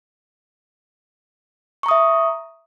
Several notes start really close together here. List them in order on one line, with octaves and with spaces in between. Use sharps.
C#6 A#5 D#6 E5